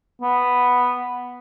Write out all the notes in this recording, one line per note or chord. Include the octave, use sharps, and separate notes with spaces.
B3